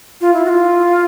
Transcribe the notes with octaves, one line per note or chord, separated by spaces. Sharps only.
F4
E4
F#4
F4